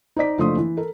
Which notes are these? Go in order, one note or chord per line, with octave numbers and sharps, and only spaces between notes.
D#4 C5 D5 B6
F#1 F3 A3 D4 C6 D#6
E3
A4 A#4